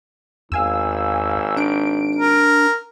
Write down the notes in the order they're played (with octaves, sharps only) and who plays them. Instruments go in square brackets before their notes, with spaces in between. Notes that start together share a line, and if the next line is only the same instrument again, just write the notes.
[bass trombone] G#1 [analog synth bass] E2 [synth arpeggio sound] F5 G#5 E6
[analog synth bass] D4 [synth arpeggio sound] D7
[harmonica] A#4